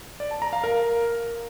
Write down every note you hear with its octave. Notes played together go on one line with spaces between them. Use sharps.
D5
A5
A#5
F5
A#4